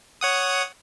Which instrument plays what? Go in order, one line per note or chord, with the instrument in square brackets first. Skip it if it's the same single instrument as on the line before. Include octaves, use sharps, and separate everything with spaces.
[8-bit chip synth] C#5 F#5 D#6